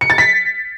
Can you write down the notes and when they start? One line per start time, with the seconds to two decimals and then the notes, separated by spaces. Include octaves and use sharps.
0.01 C#7
0.10 A6
0.18 B6